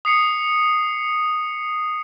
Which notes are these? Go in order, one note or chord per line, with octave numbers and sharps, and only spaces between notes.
D#6 C7 C#7